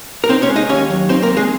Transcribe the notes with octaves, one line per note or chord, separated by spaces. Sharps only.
A#4
C4 D#4 C5
C#4 C#5
G#3
D#4 D#5
D#2 C#4 C#5
F#3
C4 D#4 C5
A#3 A#4
C4
G#3 G#4